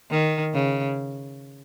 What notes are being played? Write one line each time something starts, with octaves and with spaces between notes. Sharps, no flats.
D#3
C#3